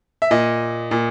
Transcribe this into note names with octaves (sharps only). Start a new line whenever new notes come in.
E5
A#2 D#5
A#2